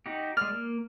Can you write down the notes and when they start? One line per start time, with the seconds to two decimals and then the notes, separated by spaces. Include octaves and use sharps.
0.06 D#4 F#4 G4
0.37 G#3 D5 F6
0.52 A#3